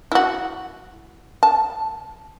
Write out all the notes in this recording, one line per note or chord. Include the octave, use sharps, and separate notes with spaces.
E4 F#4
A5